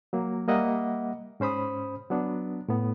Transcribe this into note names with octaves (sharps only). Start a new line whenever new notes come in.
F#3 A#3
G3 A#3 D#5 E5 F#5
G#2 C#4 C5 B5 D#6
F#3 B3 D4
A2 B3